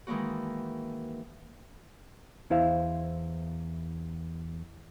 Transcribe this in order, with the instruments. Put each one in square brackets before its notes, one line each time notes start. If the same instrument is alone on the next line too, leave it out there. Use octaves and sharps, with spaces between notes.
[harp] D#3 E3 G#3 A#3 F#4
[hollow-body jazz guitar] E2 E4 C5 F5